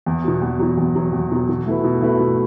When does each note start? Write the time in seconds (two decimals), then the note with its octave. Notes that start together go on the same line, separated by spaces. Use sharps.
0.06 E2
0.24 B2 F#3
0.42 E2
0.59 B2 F#3
0.77 E2
0.95 B2 F#3
1.13 E2
1.31 B2 F#3
1.49 B2
1.66 A3 E4 B4
1.84 B2
2.02 A3 E4 B4
2.20 B2